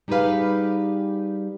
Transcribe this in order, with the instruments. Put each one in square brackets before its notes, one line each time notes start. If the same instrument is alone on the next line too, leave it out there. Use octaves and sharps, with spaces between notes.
[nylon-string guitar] G3 D#4 G4 G#4 B4 F5